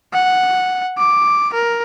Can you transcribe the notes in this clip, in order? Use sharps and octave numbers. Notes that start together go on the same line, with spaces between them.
F#5
D6
A#4